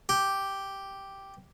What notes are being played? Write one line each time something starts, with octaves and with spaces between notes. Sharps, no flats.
G4